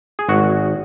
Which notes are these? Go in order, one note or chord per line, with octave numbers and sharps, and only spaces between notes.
G#4
G#1 F#4